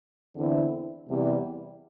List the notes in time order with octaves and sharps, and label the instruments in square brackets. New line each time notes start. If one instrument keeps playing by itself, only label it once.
[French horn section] E2 D3 C4 E4
E2 C3 G3